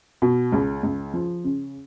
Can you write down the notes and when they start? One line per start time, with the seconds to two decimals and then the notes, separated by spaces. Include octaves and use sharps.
0.22 B2
0.52 C#2
0.83 C#2
1.14 F3
1.44 C#3